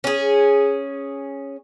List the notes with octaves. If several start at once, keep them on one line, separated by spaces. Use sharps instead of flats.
C#4 G#4